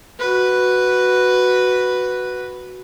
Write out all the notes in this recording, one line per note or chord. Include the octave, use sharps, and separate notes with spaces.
F#4 B4